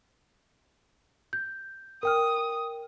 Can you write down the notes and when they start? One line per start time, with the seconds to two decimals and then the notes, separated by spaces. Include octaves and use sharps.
1.33 G6
2.03 A#4 G5 D#6 F6